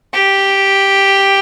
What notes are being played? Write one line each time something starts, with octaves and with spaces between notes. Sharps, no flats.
G4